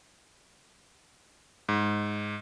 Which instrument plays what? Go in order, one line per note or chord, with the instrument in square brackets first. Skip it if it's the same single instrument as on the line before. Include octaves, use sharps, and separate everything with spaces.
[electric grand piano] G#2